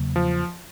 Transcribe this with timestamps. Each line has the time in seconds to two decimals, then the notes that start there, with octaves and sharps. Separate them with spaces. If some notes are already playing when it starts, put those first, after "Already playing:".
Already playing: E2 C#3 F#3 A#3
0.16 F3